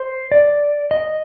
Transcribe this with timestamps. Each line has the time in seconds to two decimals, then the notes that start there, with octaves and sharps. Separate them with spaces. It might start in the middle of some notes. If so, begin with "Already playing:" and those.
Already playing: C5
0.32 D5
0.91 D#5